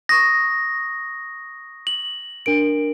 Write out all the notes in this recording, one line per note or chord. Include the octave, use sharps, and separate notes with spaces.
C#6 D#6 A#6
F#7
D4 A#4 D7